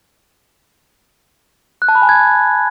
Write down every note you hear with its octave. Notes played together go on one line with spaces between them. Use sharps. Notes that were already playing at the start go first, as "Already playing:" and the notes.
F#6
A5
B5
G#5
G#6